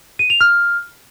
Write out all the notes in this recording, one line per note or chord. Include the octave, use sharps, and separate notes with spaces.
D#7
F7
F6